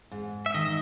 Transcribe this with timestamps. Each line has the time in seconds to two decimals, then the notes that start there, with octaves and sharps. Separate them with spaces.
0.11 G#2
0.46 E5
0.54 D#3 D#5